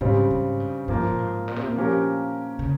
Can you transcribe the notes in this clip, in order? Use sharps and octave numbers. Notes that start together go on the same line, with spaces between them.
G#2 C#3 G3 C4
G#2
G2
G2 F3 A#3 F4
A#2
G#2
A#2
C3
A#2
F3 A#3 C#4 G4 A#4
C#3